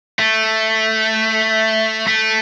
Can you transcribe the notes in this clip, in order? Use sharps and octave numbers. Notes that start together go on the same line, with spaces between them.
A3
A3